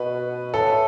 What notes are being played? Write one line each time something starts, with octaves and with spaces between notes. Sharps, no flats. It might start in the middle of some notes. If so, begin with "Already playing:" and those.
Already playing: B2 B4
A2 A4